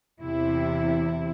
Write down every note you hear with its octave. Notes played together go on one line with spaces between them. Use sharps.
E2 C3 E4